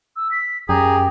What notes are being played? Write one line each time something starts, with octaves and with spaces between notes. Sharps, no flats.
E6
B6
F#2 G4 G#4 A#5